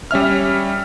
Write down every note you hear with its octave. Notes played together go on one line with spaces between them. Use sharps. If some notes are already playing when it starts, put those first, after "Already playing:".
G3 C#4 E5 F6